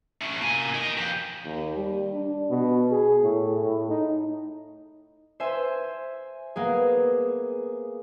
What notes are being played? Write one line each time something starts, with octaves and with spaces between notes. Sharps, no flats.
A3 C#4
A#3 G#5
A#4 D#5
F3 G4
D#2
G3
D4
B2
G#4
A2
A2
D#4
C5 E5 G#5
A#3 B3 G#4